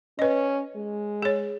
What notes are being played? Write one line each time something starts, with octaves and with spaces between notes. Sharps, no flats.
C#4 B4 D#5
G#3
G#4 C#5